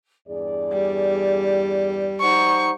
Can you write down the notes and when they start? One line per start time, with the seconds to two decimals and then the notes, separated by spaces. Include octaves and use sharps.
0.28 E2 G2 G#4 D5
0.73 G3
2.21 D#4 C5 F#5 C#6